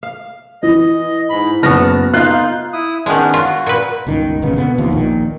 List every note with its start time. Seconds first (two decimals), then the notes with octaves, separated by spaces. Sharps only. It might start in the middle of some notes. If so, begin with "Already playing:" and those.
0.03 F5
0.63 E3 D#5
1.30 G#2 B5
1.63 F#1 B3 F#4 B4 A5 F6 A#6
2.14 D#4 F4 F5 F#6 G6
2.73 E4 D#6
3.06 D#3 G#3 B3 C#4 D4
3.34 F4 F#4
3.66 A#2 B4
4.07 G1 C#2 D#3
4.42 E1 A1 C#3 B3
4.57 B2 D3 B3
4.78 D#2 C3 F3
4.92 A#1 A#2 D#3